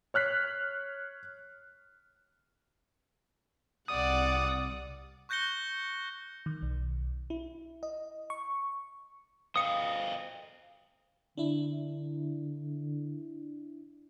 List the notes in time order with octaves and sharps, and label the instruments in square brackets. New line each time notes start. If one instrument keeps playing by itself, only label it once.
[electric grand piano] C#5 F6 F#6 B6 C7
[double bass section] C2 C3 [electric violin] D5 F#5 [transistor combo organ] D#6
[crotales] C#6 F#6 G6 A#6 C#7 G7
[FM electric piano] D#3
B1
E4
D#5
C#6
[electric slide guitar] C5 D#5 F5 [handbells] D#6 C#7
[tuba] D3 [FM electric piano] D4 E4